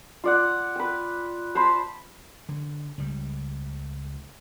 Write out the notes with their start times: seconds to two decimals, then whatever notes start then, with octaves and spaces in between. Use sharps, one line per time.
0.24 F4 D5 F#5
0.76 B4 G5
1.55 C5 A5 B5 C6
2.49 D3
2.98 C#2 G3